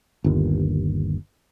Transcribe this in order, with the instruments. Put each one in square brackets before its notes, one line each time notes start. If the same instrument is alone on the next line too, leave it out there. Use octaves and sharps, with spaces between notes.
[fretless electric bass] G1 D#2